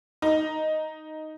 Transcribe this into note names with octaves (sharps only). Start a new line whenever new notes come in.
D#4